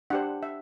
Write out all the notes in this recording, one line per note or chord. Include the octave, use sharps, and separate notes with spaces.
D4 G4 C5 F#5
E5